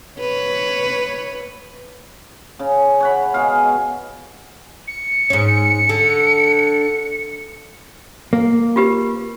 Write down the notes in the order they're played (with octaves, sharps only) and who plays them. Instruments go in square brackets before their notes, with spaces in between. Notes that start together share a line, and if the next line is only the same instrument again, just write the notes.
[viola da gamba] B4 C#5
[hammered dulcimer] C#3
C#5 F#5 B5
B2 G#3 G#4 F5
[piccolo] C#7
[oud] G#2 C#4
D3
[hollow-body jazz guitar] A#3
[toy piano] F4 G4 B4